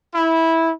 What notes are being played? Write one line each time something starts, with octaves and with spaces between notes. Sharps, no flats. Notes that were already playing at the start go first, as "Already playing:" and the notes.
E4